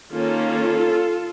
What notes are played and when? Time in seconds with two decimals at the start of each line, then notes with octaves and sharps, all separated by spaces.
0.12 D#3 A#3 C#4 F4 A4